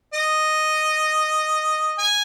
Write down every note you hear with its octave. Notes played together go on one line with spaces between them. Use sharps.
D#5
G#5